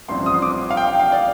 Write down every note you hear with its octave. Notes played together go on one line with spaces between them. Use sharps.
A1 G2 F3 C4 C6
D#6
C6
D6
F5
G5
F5
D5